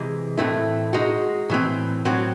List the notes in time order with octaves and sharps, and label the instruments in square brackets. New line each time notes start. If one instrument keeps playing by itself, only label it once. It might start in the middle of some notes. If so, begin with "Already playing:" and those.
Already playing: [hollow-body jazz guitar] C3 E3 G#3
A2 E3 A3 C4 E4
G#3 D#4 F#4
A2 E3 C4
A2 F#3 C4 F#4